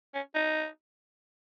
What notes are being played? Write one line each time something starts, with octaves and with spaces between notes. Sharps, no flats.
C#4
D#4